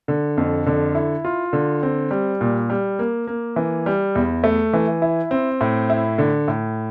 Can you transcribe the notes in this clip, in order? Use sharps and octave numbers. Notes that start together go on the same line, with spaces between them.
D3
F2
D3
E4
F4
D3
C4
G3
A#2
G3
A#3
A#3
E3
G3
E2
A3
E3
E4
C4
A2
E4
D3
A2